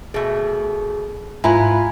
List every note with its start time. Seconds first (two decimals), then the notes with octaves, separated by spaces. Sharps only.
0.14 B2 A3 G#4
1.44 G#2 E4 F4 B4 G#5 A#5 B5